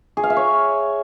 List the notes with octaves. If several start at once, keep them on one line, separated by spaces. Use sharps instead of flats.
G#4
F5
E5
C#5